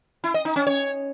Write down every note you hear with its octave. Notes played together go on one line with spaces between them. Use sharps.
E4
D#5
D#4
C#4
C#5